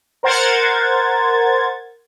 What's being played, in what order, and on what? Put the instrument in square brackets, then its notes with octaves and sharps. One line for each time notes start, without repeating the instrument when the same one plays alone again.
[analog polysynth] A#4 C5 F#5 G#6 A6